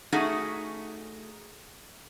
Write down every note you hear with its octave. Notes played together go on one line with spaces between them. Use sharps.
A3 C#4 D#4 F#4 G#4 F#5